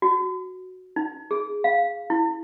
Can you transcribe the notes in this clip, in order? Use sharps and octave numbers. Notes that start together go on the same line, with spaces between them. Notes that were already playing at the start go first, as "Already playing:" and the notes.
F#4
D#4
G#4
F5
E4